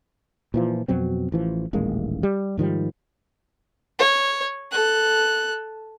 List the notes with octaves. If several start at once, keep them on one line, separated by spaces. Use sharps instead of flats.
A#2 E3 F3
F2 B2 F#3 C4
A1 E3 F3
D#1 A1 G#3 A#3
G3
G#2 D#3 F3 G3
C#5
A4 F#6